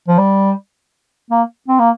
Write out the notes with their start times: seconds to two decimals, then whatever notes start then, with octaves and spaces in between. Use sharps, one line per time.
0.08 F3
0.18 G3
1.30 A#3
1.69 C4
1.79 A#3